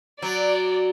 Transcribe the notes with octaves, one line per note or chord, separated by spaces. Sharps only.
F#3 D5